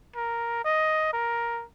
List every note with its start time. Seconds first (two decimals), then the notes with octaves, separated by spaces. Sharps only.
0.16 A#4
0.65 D#5
1.13 A#4